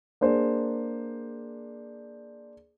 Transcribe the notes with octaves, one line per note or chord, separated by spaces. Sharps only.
A#3 D4 G#4 C5